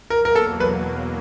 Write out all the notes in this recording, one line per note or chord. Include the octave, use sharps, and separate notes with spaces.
E2 B2 F#3 A#3 A#4
A#4
A4
B4